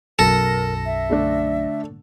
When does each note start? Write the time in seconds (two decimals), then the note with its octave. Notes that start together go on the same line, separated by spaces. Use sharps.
0.19 B1 F#2 A4 A#4 A#6
0.86 E5
1.10 D3 A3 D4